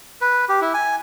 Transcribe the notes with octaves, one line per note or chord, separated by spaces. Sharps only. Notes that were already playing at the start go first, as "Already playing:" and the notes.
B4
G4
E4
G#5